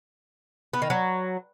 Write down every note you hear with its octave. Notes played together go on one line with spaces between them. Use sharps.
B3
D#3
F#3